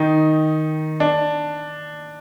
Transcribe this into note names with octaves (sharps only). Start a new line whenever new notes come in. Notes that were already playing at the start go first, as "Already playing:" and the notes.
Already playing: D#3 D#4
D4